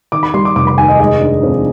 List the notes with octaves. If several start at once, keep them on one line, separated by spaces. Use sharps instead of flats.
D#3 D6
B5
G3 C6
D6
F1 D6
B5
D#2 G#5
D#5
G#3 D#5
D4
F2